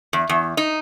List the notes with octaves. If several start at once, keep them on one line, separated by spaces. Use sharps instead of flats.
E2
E2
D#4